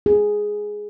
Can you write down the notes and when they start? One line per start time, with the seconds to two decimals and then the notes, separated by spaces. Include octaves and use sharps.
0.06 G#4